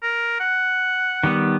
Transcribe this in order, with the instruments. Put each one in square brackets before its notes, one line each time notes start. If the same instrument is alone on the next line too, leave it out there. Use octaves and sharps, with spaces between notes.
[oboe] A#4
F#5
[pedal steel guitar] D#3 G3 B3